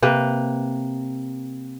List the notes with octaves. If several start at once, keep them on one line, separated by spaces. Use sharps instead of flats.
C3 A#3 B4